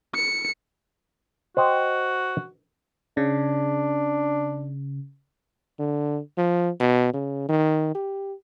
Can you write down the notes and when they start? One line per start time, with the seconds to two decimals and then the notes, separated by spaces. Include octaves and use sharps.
0.14 C#7
1.57 F#4 C5 D#5 G5
3.17 C#3 D4
5.79 D3
6.38 F3
6.80 B2
7.14 C#3
7.49 D#3
7.95 G4